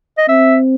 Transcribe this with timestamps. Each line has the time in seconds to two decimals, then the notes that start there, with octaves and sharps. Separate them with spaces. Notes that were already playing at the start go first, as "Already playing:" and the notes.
0.18 D#5
0.29 C4 E5